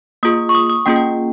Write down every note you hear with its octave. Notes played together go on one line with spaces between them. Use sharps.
A#3 F4 G#4 D#6
C#6
D#6
D#6
A#3 C#4 F4 G#4 G5
G5